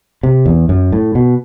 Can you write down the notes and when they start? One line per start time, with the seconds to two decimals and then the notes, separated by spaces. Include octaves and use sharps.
0.23 C3
0.46 E2
0.69 F#2
0.92 A2
1.15 B2